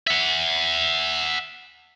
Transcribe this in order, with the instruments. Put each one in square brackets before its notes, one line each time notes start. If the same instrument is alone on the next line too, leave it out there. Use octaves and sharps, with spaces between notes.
[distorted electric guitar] E5 F#5